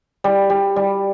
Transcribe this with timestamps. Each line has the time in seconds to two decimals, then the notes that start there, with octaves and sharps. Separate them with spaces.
0.24 G3
0.50 G3
0.76 G3